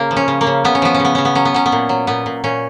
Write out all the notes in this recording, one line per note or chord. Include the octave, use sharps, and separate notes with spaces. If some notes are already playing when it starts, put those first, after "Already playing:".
Already playing: C#3 A#3
F3
C#4
C#3
A#3
C#3
C#3 B3
C#4
F3 B3
C#4
C#3
B3
C#3 C#4
B3
F#3 C#4
B3
F#3 C#4
B3
A#2
F#3
A#2 B3
A#2
A#2 C#4